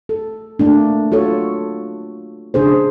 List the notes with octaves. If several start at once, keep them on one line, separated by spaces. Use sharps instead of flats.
A4
A3 A#3 D4
F4 F#4 A4 C#5
C#3 D4 G#4 C5